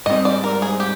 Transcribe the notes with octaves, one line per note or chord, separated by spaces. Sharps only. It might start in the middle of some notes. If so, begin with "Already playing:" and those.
G#2 G3 C4 D#5
D5
A#4
G#4
G4